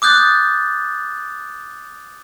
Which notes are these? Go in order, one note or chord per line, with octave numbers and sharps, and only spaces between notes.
D6 D#6 F#6 G6 A6